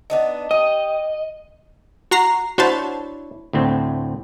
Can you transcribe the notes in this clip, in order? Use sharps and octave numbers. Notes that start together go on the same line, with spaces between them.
B3 D4 D#4
G4 D#5
F#4 A#5 C7
D4 E4 F#4 C5 C#5 A5
D2 A2 C4